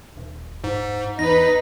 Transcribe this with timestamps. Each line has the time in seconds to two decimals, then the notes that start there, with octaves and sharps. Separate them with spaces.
0.17 D#1
0.64 G#2
1.19 E2 D#4 B4 A#6